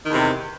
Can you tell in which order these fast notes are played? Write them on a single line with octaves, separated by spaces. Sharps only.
D#3 E2 C3